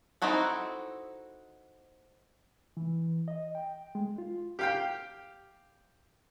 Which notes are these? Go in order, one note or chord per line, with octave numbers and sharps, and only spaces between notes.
C4 D#4 E4 F#4 A4
E3
D#5
G5
G#3
F4
G4 F5 G5